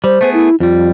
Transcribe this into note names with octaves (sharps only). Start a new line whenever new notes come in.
G3 C5
A3 B3 G#4
E4
F2 G3 F4